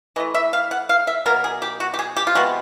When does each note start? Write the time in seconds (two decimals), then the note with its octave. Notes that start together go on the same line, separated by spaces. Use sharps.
0.16 E3 D#5
0.20 A3
0.34 E5
0.53 F5
0.71 F#5
0.89 F5
1.07 E5
1.26 B2 F#3 A#3 A#4
1.44 G#4
1.62 G4
1.80 F#4
1.94 G4
1.99 G#4
2.17 G4
2.27 F4
2.35 C3 F3 G#3 B3 F#4